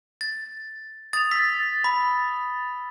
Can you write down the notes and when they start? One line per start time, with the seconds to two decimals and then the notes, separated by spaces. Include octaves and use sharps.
0.21 A6
1.13 D#6 A6 F7
1.31 E6 A6 B6
1.84 B5